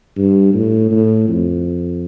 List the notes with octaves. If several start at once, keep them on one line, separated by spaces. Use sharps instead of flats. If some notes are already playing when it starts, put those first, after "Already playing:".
G2
A2
A2
F2